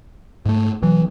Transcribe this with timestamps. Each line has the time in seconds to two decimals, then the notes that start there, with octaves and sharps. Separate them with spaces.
0.46 G#2 A3
0.83 B2 E3 F#3